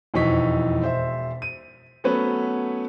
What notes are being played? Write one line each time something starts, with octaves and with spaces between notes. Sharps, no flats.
E1 F2 E3 D#4 C#6 B6
E1 C5 E5
D#7
F#3 A3 B3 C#4 B4